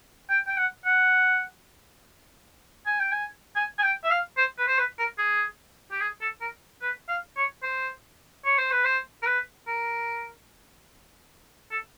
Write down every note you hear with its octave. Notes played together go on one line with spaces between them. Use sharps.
G5
G5
F#5
F#5
G#5
G5
G#5
G#5
G#5
G5
E5
F5
C5
B4
C5
B4
A#4
G#4
G4
G#4
A4
A#4
B4
F5
C#5
C5
C#5
C5
B4
C5
A#4
B4
A#4
A4